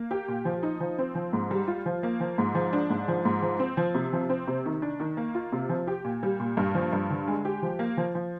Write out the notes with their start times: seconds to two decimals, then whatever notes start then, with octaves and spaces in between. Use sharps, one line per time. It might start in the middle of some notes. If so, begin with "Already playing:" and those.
Already playing: A#3
0.11 G4
0.28 A#2
0.45 F3
0.63 D#4
0.80 F3
0.99 C4
1.15 F3
1.33 G#2
1.51 G3
1.67 F4
1.86 F3
2.03 A#3
2.20 F3
2.38 G#2
2.55 F3
2.73 D4
2.90 G#2
3.08 F3
3.25 G#2
3.42 F3
3.60 C4
3.77 F3
3.94 C3
4.13 F3
4.30 C4
4.47 C3
4.66 D#3
4.82 D4
5.00 D#3
5.17 A#3
5.35 F4
5.52 C3
5.69 F3
5.87 G4
6.04 A#2
6.23 G3
6.40 A#2
6.57 G2
6.75 F3
6.93 G2
7.10 D3
7.28 G#3
7.45 G4
7.63 F3
7.79 A#3
7.97 F3
8.15 F3